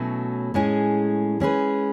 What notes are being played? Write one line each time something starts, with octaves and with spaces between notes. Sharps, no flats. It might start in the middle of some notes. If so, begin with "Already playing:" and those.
Already playing: B2 F#3 A3 C#4 E4
A2 G#3 C#4 G#4
G#3 C#4 G#4 B4